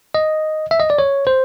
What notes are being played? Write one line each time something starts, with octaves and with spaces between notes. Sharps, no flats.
D#5
E5
D#5
D5
C#5
C5